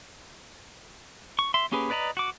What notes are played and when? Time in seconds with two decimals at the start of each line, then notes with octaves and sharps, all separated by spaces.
1.39 C#6
1.54 E5 C6
1.72 A#3 C#4 G4 G#4 B4
1.90 B4 D5 D#5 A#5 B5
2.17 F#4 D6